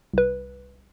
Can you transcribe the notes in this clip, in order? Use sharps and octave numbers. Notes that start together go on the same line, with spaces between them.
C2 B4